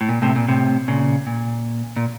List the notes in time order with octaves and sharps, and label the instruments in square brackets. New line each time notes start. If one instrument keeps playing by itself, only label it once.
[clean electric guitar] A2
A#2
A2 C3
A#2
A2 C3
A#2 C#3
A#2
A#2